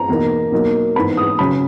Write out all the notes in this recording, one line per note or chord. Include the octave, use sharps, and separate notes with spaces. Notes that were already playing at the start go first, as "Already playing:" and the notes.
Already playing: A#5
E2 B2 A#3 D#4
B2 F#3 A#3 D#4
G#2 E3 B3 B5
D#6
C#3 F#3 C#4 B5